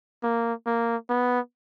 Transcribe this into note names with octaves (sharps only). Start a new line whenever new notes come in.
A#3
A#3
B3